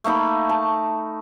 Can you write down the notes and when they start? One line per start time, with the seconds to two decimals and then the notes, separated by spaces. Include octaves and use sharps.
0.04 A3 A#3 D#4 B5
0.49 A5